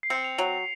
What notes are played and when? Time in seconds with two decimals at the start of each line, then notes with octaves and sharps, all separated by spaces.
0.03 C7
0.10 C4 C#7
0.24 F7
0.38 F#3 F7